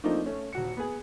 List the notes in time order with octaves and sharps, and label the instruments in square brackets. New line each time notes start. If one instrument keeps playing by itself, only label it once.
[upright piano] F3 A3 A#3 C4 D4 D#4
A3 C#4
D#1 F#4 C#7
B3 G#4